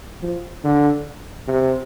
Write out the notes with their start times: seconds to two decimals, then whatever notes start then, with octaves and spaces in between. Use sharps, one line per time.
0.23 F3
0.64 D3
1.47 C3